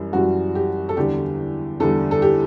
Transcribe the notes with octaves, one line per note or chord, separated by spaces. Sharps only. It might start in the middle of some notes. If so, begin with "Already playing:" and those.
Already playing: F#2 E3 G3
F#2 E3 G3 F#4
G4
A4
E2 D3 G3 G4
E2 D3 G3 A4
A4
G4